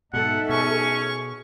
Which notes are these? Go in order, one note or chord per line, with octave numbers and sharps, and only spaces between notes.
G#2 B2 D#4 A4 E5 F#5
B2 C#4 G#4 C#6